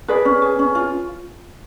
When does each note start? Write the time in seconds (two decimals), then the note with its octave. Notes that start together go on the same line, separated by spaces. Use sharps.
0.08 G#4 B4 D5
0.25 C#4
0.42 G#4
0.59 C#4
0.75 F4